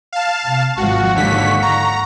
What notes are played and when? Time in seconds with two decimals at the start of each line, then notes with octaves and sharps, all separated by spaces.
0.13 F5 A5
0.44 C3
0.78 G#1 F3 F#4 F5 F#5 C#6
1.15 D#2 G#2 D3 B6
1.62 A#5